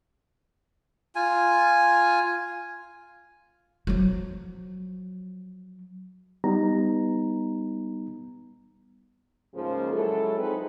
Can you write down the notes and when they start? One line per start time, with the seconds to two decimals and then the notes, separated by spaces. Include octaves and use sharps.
1.15 F4 G#5
3.87 F3 F#3
6.44 G3 B3 D#4 A#5
9.54 G#2 C#3 F3 A#3 A#4 C5
9.92 F#3 G#3 E4 A4
10.38 F3 C4 D#4 G#4 B4